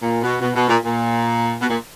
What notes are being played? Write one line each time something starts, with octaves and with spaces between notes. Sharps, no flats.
A#2
B2
B2
B2
A#2
A#2
B2
A#2